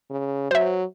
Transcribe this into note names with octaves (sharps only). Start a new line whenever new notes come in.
C#3
F#3 C5 E5